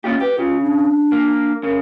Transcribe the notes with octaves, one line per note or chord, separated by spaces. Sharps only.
A#3 C#4 F4 G4
G4 B4
C#3 F4
D4
A#3
C#3 A#4